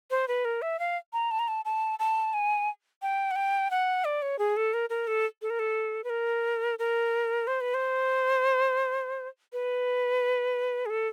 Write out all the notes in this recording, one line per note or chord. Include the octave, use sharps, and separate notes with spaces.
C5
B4
A#4
E5
F5
A#5
A5
A#5
A5
A5
A5
G#5
G5
F#5
G5
F#5
D5
C#5
G#4
A4
A#4
A#4
A4
A4
A#4
A4
B4
A#4
A#4
C5
B4
C5
B4
G#4
A4